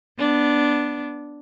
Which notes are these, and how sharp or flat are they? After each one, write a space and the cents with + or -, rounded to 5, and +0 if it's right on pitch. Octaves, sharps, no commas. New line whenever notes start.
B3 +0 D4 +0